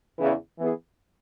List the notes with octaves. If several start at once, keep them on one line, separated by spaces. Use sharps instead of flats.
E2 C#3 E3
E3 B3 E4 G#4